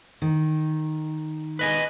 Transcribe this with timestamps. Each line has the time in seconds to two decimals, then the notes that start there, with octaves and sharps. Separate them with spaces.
0.22 D#3
1.59 B4 D#5 G#5